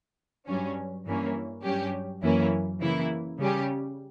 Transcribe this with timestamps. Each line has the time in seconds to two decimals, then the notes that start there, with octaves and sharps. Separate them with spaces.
0.47 G2 F#3 C#4
1.06 G2 E3 A#3 C#4
1.64 G2 F#3 C#4 G4
2.23 F#2 E3 A#3 C#4 E4
2.81 C#3 E3 A#3 E4
3.39 C#3 G3 C#4 G4